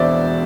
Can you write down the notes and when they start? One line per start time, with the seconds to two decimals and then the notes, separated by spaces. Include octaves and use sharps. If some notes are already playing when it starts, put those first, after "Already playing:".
Already playing: E1 E2 B2 C5 D5 E5